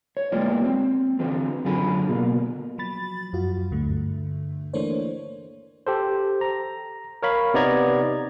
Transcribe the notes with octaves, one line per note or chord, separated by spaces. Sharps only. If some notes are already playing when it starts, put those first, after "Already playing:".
C#5
G3 G#3 A#3 B3 F4 D5
C4
D3 E3 C4
F#2 D3 F4 G#4 B5
B2 A#3
F3 F#3 B5 A6
F#2 F4 F#4
D2 G2 D3 A3
E3 A3 A#3 D4 C5 C#5
G4 A4 C5
A#5
A#4 C#5 F5 B5
C3 B3 D#4 D5 A#5 G#6